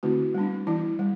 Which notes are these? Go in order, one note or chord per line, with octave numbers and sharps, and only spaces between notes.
D3 A3 C4 E4 F#4
G3 B3 D4
E3 B3 E4
G3